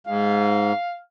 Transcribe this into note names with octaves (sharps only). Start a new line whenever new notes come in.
G#2 F5